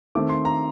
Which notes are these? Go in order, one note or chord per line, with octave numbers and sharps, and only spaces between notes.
D#3 A3 C4 D6
C6
A#5